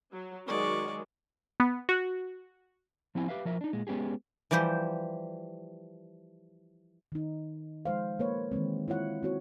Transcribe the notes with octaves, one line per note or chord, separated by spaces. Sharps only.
F#3
D#3 F#3 G#3 D5 C#6
B3
F#4
F3 C4 E4 G#5
G4 B4 E5 F5
F3 A#4 E5
D4 D#4
A#2 G#3
G#3 B3 C#4 G4 G#4
E3 F3 G3 G4 C5
D#3 D#4
F3 G#3 C5 F5
A#3 B4 C#5
D#3 E3 G#3 C4
E4 F4 C#5 F#5
C4 E4 F#4 C#5